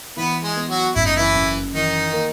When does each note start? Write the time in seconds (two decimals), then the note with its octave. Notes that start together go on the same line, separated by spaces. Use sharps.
0.17 E3 B3 B4
0.43 G#3 G#4
0.56 B3
0.69 F#3 F#4
0.95 F#1 E4
1.06 D#4
1.16 E3 E4
1.35 F#2
1.74 D#3 E3 D#4
2.13 A#3